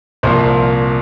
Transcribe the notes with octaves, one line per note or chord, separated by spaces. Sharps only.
C2 A#2 F3 C5